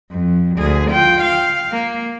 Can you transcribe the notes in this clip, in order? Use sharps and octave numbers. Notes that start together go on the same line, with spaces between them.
F2
D2 G#4
F4 G5
F5
A#3